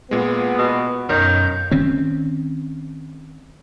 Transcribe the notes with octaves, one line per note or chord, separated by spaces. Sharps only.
A#2 G#3 B3
B2
B1 F#2 D#3 A#4 C#5 G6
D#3 C4 C#4